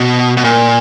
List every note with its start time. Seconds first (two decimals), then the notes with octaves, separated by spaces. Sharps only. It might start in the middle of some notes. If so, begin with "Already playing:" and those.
Already playing: B2
0.37 B2
0.44 A#2